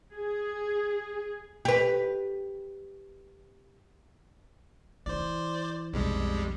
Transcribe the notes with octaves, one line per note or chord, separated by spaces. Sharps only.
G#4
G4 B4
E3 E4 C5 D5
B1 F2 G3 G#3